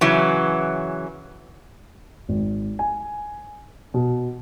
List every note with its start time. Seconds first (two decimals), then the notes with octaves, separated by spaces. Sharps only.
0.01 C#3 E3 F#3
2.29 G#1
2.79 G#5
3.94 B2